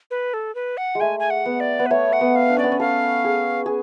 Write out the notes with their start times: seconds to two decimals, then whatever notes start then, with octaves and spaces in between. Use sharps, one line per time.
0.11 B4
0.34 A4
0.55 B4
0.77 F#5
0.95 G#3
1.00 A3 G#5
1.19 G#5
1.30 F#5
1.46 B3
1.60 D5
1.79 B3
1.86 B4
1.91 A3 C#5
2.13 F#5
2.21 B3
2.36 F5
2.50 D4
2.57 C#4 D5
2.64 B3
2.72 C#4
2.80 A4 F5
3.24 G#4
3.66 G#4